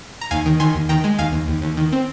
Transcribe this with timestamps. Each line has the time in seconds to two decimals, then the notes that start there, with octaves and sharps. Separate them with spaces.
0.21 A#5
0.31 D#2 F5 G#5
0.46 D#3
0.60 D#3 G#5 C6
0.75 D#2
0.89 D#3 G5 A#5
1.04 G#3
1.18 D#2 F5 G#5
1.33 D#2
1.48 D#2
1.62 D#2
1.77 D#3
1.92 C4